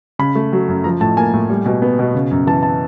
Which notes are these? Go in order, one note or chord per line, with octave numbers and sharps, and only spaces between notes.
C#3 B5
A3
F#3
F#2
F3 A#5
A2 A5
A#3 G#5
A2
G3
B2
B3
B2
C#3
F#2
E3 A5
A5